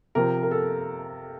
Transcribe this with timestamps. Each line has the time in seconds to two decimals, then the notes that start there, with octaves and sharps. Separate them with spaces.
0.15 C3 F3 A#4
0.43 A#4
0.51 A4